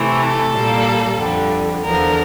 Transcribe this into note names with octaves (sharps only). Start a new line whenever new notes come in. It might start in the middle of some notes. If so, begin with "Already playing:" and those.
Already playing: C3 E3 A3
A4
A#2 G3 A#3
F2 D3 G3
E2 D3 F3 A#4